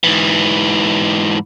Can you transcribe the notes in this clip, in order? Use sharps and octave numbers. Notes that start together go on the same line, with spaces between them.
G#2 E3